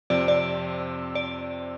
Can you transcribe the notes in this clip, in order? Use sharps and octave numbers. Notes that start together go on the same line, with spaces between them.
F2 C3 F3 C4 D5
D5
D5